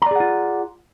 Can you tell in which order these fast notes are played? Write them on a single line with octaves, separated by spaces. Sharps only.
A#5 D5 G#4 F#5 F4